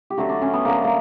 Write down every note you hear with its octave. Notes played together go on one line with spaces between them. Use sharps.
G4
D3 F#3 A3 F#4
D4
C#4
B3
D3 F#3 A3 A#3
A#3